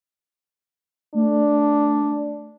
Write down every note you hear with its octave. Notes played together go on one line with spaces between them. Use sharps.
A3 D4